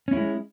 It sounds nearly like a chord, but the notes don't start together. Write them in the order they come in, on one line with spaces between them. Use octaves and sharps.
C#4 E4 G#3